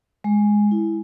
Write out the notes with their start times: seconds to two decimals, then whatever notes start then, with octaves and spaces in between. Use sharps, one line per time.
0.24 G#3
0.71 E4